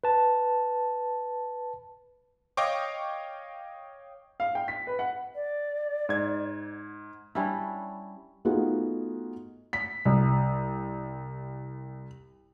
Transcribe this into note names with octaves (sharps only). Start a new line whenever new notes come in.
B4 A5
C#5 D#5 F5 G5 C#6 D6
F5
G5
B6
B4
F#5
D5
G#2 G#6
G3 C#4 D4 E4
A3 B3 D#4 F4 F#4 G#4
B6
C2